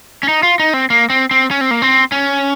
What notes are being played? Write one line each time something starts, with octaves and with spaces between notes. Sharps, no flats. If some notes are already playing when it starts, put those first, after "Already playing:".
C#4
D#4
F4
D#4
C4
A#3
C4
C4
C#4
C4
A#3
C4
C#4